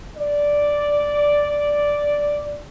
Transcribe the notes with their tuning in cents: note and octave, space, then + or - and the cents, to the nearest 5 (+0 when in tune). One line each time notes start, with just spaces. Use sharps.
D5 -5